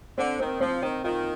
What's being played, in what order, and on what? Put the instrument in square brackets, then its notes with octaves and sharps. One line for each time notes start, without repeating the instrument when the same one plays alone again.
[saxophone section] D3 [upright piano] C4
[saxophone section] D#3 [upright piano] C4
[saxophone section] F3 [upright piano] C4
[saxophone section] D#3 [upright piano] C4
[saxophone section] D#3 [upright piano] F4